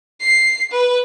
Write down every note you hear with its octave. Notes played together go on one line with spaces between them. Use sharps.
C7
B4